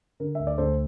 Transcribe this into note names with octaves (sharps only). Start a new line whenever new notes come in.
D3 A#4
D2 E5
D5
D2 A4 C5